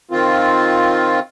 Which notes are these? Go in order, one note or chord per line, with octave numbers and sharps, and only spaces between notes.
D#3 C4 F4